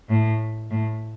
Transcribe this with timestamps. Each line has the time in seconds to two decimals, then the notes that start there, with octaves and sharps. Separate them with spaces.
0.09 A2
0.71 A2